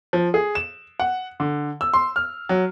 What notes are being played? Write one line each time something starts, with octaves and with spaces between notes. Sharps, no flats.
F3
G#4
E7
F#5
D3
E6
C6
F6
F#3